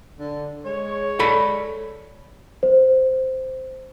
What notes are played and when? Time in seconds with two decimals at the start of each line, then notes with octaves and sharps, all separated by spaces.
0.19 D3
0.65 G#3 C#5
1.19 A4 D5 B5
2.63 C5